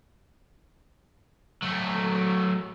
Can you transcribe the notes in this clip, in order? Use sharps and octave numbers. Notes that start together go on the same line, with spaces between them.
F#3 A3